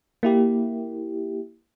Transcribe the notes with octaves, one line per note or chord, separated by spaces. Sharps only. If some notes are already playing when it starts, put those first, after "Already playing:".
A#3 E4 G4